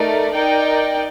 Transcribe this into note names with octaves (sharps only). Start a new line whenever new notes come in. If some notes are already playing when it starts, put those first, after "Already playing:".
Already playing: A3 D#4 A#4 D5
D#4 A#4 D5 G5